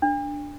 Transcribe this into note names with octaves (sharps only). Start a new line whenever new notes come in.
D4